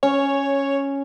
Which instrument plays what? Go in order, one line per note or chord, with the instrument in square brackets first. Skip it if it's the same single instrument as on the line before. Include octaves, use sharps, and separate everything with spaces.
[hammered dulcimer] C#4 [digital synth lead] C#5